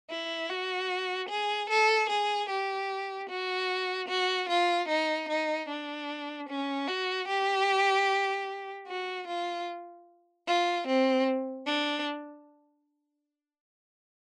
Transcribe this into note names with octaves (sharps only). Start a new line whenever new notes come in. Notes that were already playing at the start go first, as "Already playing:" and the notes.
E4
F#4
G#4
A4
G#4
G4
F#4
F#4
F4
D#4
D#4
D4
C#4
F#4
G4
F#4
F4
F4
C4
D4